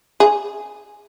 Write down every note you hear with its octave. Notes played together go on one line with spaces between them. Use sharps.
G#4